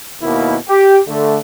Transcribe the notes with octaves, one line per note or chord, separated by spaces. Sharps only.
D#2 B2 A#3 B3 E4
G4
D3 A3